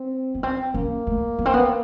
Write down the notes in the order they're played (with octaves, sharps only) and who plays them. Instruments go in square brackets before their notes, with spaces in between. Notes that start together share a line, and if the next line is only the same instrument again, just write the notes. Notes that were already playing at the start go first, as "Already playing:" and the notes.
Already playing: [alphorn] C4
[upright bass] B3
C4
[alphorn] A#3 [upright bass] C#4
[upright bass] A3
B3
C4
B3